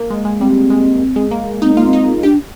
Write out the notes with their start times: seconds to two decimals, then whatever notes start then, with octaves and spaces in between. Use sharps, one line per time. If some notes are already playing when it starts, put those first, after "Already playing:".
Already playing: A#3
0.10 G#3
0.25 G#3
0.40 G3 C4
0.70 G#3
1.16 G#3
1.31 A#3
1.62 C4 D#4
1.75 A#3 F4
1.85 C4
1.93 D#4
2.23 D4 G4